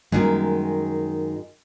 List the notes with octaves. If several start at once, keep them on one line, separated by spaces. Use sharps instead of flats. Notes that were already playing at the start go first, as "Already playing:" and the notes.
F#2 D#3 G3 G#3 A#3